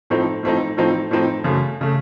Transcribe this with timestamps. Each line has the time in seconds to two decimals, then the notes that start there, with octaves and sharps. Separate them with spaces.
0.10 A2 F3 A3 C4 D#4
0.43 A2 F3 A3 C4 D#4
0.77 A2 F3 A3 C4 D#4
1.11 A2 F3 A3 C4 D#4
1.44 F#2 C#3 A3
1.81 C#3 A3